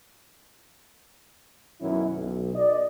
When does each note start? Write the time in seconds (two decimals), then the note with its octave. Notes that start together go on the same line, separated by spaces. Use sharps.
1.81 F#2 B2 D#3 F#3 C#4 E4
2.16 B1
2.55 D5 D#5